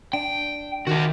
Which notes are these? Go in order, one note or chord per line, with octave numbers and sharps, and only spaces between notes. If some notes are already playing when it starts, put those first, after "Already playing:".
D4 G5
D#3 F#4 A4